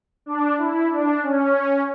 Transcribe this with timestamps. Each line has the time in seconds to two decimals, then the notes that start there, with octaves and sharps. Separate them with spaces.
0.26 D4
0.58 E4
0.91 D4
1.23 C#4